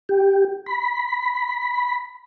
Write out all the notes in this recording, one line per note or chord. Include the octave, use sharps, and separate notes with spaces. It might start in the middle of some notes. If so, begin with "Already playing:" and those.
G4
B5